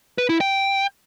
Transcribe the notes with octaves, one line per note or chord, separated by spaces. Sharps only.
B4
E4
G5